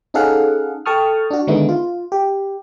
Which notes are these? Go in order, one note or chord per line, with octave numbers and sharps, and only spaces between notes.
C#4 D#4 G#4 A4 F5 F#5
A4 G5 A5 C#6 D#6 F6
D4 F#4
D3 D#3 G#3 B3 D#4 E4
F4
G4